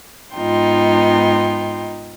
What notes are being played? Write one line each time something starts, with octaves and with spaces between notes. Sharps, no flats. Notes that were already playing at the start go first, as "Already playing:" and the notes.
G#2 B3 D#4 F4 G5 C6